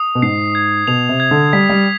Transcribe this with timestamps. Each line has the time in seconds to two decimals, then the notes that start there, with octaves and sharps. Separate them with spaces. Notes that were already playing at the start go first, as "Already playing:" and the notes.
Already playing: D#6
0.15 B2
0.22 G#2 C7
0.55 G#6
0.87 B2 F7
1.09 C3
1.20 G#6
1.31 D3
1.53 G3 B6
1.70 G3